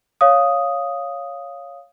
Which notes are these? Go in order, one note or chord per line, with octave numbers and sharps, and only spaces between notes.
C#5 F5 D#6